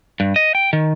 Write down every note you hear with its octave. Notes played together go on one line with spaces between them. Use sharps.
G2
D#5
G5
D#3